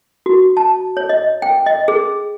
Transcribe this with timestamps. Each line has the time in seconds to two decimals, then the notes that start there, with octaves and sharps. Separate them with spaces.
0.26 F#4
0.57 A5
0.97 C#5
1.09 D#5
1.42 G5
1.66 D#5
1.88 G#4